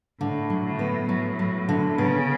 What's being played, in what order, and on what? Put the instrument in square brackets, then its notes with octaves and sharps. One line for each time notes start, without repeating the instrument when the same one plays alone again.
[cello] A2 [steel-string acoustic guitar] D3
[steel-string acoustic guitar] F#3
[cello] A2
[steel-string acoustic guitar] B3
[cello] A2 [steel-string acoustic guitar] F#3
[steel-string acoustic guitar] F#3
D3
[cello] C#3 [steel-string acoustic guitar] B3